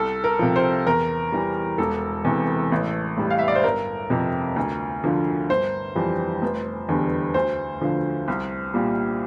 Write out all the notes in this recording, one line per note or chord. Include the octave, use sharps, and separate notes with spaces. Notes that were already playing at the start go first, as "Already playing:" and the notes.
Already playing: C2 A4
A#4
C3 F3
C5
E2 A#4
E3 G3
E1 A4
E2 C3 E3
A1
A2 G3
F5
E5
D5
C5
G1 A#4
F2 C3
D2
D3 F3
G1 C5
F2 E3 G3
F1
E2 D3 G3
D2 C5
D3 F3
C2
A#2 G3